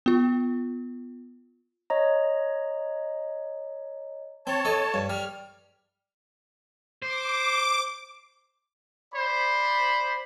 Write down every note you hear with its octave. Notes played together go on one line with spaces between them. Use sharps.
B3 F4
C#5 D#5 A#5
C4 C#5 A5
A4 D#5
G2
G3 F6
C5 D6
C5 D5 B5